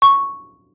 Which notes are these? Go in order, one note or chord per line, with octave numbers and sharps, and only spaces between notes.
C#6